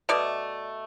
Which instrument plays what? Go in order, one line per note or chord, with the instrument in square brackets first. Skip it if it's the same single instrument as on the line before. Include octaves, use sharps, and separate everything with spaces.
[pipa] B2 A3 D5